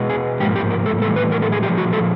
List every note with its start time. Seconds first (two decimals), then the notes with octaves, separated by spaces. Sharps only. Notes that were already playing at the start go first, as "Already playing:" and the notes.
Already playing: B2 G#3 B3
0.10 G#4
0.40 G#2 F3 A#3 G4
0.56 G4
0.70 A#4
0.86 A4
1.02 A2 E3 G3 A4
1.16 B4
1.32 A#4
1.42 A4
1.52 G#4
1.63 A#2 F3 G#3 G4
1.78 F#4
1.93 A4